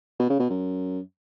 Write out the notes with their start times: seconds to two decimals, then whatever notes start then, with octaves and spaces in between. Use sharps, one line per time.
0.19 B2
0.29 C#3
0.39 B2
0.49 F#2